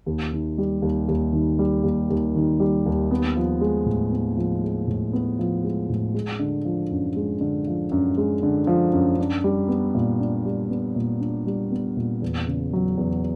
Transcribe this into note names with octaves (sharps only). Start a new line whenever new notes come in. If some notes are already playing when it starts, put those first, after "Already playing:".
D#2
D#3
G3
D#2
D#2
D#3
G3
D#2
D#2
D#3
G3
D#2
B3
F3
G#3
A2
B3
F3
G#3
A2
B3
F3
G#3
A2
G#3
D3
F3
F#2
G#3
D3
F3
F#2
G#3
D3
F3
F#2
D4
G3
B3
A#2
D4
G3
B3
A#2
D4
G3
B3
A#2
E2
C#3
F#3
E2